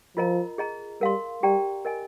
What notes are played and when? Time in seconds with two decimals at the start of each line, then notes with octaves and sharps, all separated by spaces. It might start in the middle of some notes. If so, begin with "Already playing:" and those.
0.17 F3 F4 A#4 D#5 A#5
0.58 G#4 D#5 A#5
1.01 G3 A#4 F5 C6
1.43 G3 G4 D5 G5 A#5
1.85 A#4 D#5 G#5